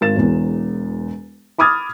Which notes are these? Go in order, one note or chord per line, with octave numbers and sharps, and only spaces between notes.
G#1 A#4 A6 E7
E1 E2
B5 D6 D#6 F6 G#6 A6